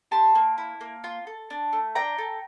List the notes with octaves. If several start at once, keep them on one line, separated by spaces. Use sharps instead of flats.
G4 A5 C6
A#3
E4
A#3
F4
A4
D4
A3
D4 G5 A#5
A4